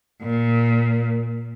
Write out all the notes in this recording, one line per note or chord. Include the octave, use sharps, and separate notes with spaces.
A#2